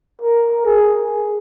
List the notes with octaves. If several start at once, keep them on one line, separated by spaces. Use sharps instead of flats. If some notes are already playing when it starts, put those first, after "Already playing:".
A#4
G#4